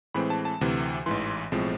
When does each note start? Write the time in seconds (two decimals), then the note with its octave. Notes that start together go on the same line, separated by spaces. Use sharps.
0.14 A2 E3 G#3 C4 B5
0.30 A5
0.45 A5
0.61 D2 C3 E3
1.06 A1 G#2 E3 C6
1.52 B1 A2 F3 G#3 C4